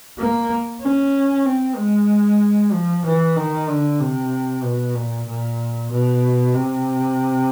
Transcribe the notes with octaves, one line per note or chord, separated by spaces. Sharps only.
A#3
C#4
C4
G#3
F3
E3
D#3
D3
C3
B2
A#2
A#2
B2
C3